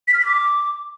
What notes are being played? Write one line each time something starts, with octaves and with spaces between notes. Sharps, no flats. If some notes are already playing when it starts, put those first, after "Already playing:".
B6
F6
B6
D6